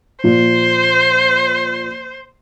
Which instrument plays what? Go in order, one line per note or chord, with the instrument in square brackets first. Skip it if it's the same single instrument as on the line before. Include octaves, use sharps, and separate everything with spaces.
[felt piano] A#2 F3 [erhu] C5